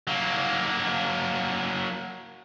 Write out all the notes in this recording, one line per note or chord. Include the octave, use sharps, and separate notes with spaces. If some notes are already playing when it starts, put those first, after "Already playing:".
F#3 A#3